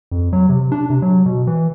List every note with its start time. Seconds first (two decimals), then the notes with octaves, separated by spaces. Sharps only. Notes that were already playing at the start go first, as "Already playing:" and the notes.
0.11 F2
0.33 F#3
0.49 C3
0.72 D4
0.90 C3
1.02 F#3
1.26 B2
1.47 E3